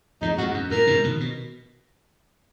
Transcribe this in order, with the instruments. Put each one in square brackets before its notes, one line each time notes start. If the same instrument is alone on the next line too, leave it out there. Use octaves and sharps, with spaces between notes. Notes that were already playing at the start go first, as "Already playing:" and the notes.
[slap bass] F2 G#2 [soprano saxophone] D#4
[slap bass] F2 G#2 [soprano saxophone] F#4
[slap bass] F#2
[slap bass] F#2 A#2 [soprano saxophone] A#4
[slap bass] G#2 B2
B2 D#3
B2